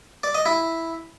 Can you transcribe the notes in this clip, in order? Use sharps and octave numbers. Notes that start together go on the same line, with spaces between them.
D5
D#5
E4